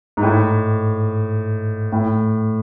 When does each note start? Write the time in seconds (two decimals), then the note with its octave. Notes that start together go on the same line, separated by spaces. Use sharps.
0.17 G#2
0.23 A2
1.92 A2